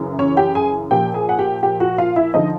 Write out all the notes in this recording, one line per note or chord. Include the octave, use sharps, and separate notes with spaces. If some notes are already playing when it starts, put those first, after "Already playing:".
Already playing: F#2 C#3 E3
C#4 C#5
G4 G5
G#4 G#5
A#2 F3 G4 G5
G#4 G#5
F#5
G4 G5
G4 G5
F#4 F#5
F4 F5
E4 E5
D3 F3 D#4 D#5